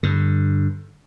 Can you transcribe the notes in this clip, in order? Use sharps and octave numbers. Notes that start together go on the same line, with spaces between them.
G2 D3